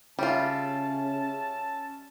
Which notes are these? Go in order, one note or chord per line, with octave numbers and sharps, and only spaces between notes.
C#3 G3 C#4 F4 E5 A5